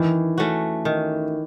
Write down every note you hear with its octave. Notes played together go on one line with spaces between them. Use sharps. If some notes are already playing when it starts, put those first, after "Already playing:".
Already playing: D#3 E3
A3 C#4 F#4
D#3